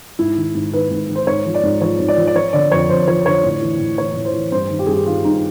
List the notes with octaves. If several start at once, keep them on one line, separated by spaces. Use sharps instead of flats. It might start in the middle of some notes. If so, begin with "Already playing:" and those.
G#2 E4
D#3
G#2
D#3 B4
G#2
D#3
C5
G#2 C#5
F3
D5
G#2
F3 C#5
G#2
D5
F3
D5
F3 C#5
D3 D5
F2 C#5
F2 C5
F3 C#5
D3 C#5
A2
E3
A2
E3 C#5
A2
C5
E3
G2 C5
D#3
G4
G2 G#4
G4
D#3 F4
G2 D#4